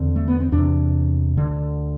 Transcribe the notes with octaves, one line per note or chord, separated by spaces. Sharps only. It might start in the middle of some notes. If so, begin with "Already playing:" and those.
Already playing: E2 D3 C4
A3
B3
C4
E2 C3 D4
D2 D3